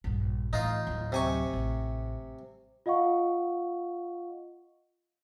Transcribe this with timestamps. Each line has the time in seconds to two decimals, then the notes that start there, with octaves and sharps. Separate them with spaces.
0.04 A#1 G2
0.53 A2 E3 D#4 F4 F5
0.87 D1 F#3
1.12 C3 G#5 C#6
1.53 A1
2.86 F4 D#5 F5 F#5 C#6